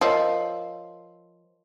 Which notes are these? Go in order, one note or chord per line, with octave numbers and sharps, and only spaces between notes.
F3 A#4 C#5 D#5